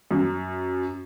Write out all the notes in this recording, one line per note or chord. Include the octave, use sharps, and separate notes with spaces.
F#2